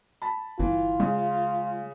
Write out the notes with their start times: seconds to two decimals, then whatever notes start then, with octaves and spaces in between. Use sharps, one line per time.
0.22 A5 B5
0.59 G1 E3 F4
1.00 C#3 G#3